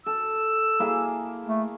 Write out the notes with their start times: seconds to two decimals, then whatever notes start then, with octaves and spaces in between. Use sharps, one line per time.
0.06 A4 E6
0.80 A#3 E4 G#4
1.47 A3